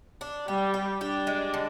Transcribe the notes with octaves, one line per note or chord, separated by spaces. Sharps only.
D4
G3 G4
G4
D4 G4
G#3
D3